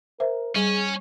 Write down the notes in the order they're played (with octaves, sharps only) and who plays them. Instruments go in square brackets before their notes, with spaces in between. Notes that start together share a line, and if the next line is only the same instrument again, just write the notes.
[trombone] A#4 [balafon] C5 E5
[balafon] G3 [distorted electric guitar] C#4 [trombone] G#4